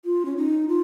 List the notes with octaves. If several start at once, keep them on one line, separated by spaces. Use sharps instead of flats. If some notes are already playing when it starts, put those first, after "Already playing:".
F4
C#4
D#4
F4